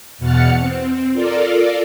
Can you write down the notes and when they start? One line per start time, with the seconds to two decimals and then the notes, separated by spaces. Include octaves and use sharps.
0.18 E2 B2 F#5 F6 A6 C#7
0.59 C4
1.13 F4 A4 A#4 D5